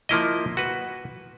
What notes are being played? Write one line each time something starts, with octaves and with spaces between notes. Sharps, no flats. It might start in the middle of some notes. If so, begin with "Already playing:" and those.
F3 A#3 E4 D#5
F#4 B4